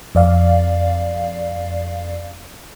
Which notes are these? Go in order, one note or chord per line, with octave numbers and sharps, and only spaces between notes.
F2 D5 F5